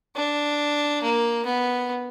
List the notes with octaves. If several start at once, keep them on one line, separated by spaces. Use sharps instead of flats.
D4
A#3
B3